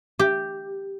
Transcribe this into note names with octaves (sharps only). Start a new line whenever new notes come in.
G4